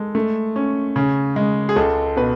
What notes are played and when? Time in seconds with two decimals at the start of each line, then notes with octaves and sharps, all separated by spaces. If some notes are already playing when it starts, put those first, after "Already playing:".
Already playing: G#3 A4
0.15 A3
0.56 C#4
0.96 C#3
1.36 G#3
1.69 G#4
1.76 C#2 A4
2.16 B2 B4